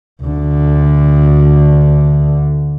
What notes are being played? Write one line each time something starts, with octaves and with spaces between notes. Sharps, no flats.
D2 D3